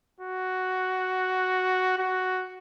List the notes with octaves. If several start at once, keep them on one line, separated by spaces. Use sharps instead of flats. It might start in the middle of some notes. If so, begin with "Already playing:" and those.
F#4
F#4